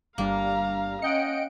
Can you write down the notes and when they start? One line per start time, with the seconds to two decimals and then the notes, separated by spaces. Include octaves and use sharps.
0.18 G1 G3 A#3 D4 F5 A#5
1.02 C#4 D#5 F#5 G5 C#7 D7